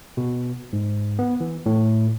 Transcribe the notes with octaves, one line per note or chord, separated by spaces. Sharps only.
B2
G#2
B3
E3
A2